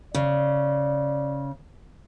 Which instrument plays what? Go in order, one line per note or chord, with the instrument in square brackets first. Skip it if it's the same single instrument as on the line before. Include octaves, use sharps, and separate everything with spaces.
[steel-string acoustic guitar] C#3 [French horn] D5